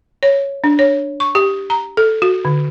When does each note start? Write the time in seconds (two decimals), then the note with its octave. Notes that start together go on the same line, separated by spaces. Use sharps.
0.23 C#5
0.64 D4
0.79 C#5
1.20 C#6
1.35 G4
1.70 A#5
1.97 A4
2.22 F#4
2.45 D3